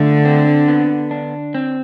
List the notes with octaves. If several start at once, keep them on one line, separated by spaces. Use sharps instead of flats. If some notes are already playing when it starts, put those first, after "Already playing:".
Already playing: D3 A3 F4
C4
B3
D4
C4